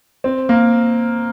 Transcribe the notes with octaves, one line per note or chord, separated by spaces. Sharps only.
C4
A#3